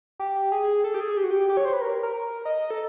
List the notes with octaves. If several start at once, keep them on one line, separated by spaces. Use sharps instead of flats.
G4
G#4
A4
G4
G#4
G4
F#4
G4
G4
C#5
C5
B4
A#4
A#4
D#5
A4